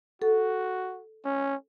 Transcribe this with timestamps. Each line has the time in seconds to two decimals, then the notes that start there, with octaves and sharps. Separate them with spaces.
0.22 F#4 A4
1.25 C#4